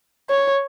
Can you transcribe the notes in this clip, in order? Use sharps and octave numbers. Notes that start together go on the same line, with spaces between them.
C#5